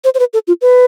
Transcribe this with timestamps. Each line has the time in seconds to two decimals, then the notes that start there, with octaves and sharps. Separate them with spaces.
0.04 C5
0.14 C5
0.19 B4
0.33 A4
0.47 F4
0.61 B4